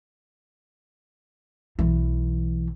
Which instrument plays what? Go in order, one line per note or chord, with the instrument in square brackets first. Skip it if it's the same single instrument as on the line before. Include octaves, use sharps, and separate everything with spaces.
[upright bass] B1 E3